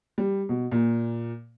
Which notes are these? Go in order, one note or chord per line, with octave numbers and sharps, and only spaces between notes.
G3
B2
A#2